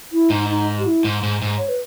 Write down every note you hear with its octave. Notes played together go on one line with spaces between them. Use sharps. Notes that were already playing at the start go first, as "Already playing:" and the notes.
E4
G#2 D#4
D#4
G4
E4
G#2
G#2
G#2
C#5
B4